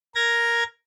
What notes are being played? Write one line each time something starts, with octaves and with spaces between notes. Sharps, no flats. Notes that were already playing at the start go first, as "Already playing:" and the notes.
A#4 G#6 A#6